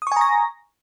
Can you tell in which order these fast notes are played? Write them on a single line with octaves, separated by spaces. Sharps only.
D#6 C#6 G#5 A#5 A#6